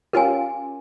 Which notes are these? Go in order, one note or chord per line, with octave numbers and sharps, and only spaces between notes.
C#4 F4 G4 A#4 G#5